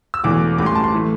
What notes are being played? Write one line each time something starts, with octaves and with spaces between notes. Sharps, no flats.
E6
E1 E2 E3 A3 D6
A1 A2 G3 D6
C6
A5
C6
E3 A3